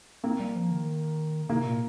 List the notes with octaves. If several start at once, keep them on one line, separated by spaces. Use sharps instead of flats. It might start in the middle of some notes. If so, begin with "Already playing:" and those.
A#3 C4
G3
F3
D#3
C3 A#3
A#2